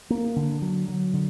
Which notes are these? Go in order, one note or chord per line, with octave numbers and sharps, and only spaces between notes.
A#3
D3
F#3
F#3
D3